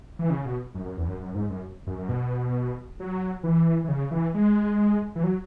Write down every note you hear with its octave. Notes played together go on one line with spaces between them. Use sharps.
E3
C#3
B2
F#2
F#2
E2
F#2
F#2
G#2
F#2
F#2
F#2
B2
F#3
E3
E3
C#3
E3
G#3
E3
F#3